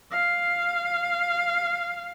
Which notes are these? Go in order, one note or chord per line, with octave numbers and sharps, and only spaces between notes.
F5